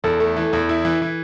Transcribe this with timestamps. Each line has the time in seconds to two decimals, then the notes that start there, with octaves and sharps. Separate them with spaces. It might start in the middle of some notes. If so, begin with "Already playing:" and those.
0.04 E2 A4
0.20 A3
0.36 E3
0.53 E2
0.69 E4
0.85 E3
1.02 E3